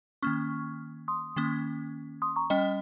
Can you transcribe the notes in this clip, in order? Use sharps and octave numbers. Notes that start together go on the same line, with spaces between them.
D#3 A#3 C#4 C#6 F6
C6 D#6
D#3 A#3 C#4
C6 D#6
A#5 C#6
G3 C#4 D#5 G5